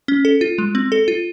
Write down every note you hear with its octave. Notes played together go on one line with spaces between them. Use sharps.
C#4
A4
F4
G#3
C4
A4
F4